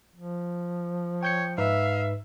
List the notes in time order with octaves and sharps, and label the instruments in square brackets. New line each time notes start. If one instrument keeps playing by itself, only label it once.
[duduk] F3
[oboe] C#5 [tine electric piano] G5 G6 C#7
[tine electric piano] G#2 D#4 B4 [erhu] E5 [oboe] F5